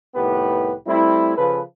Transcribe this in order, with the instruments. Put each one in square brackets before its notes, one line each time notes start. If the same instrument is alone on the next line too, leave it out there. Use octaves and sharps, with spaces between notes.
[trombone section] C2 A2 D#3 B3 G4 B4
G3 A3 C4 E4
C#3 F3 A4 B4